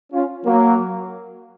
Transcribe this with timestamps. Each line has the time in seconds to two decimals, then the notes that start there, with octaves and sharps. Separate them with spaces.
0.12 C#4 F4
0.45 F#3 A#3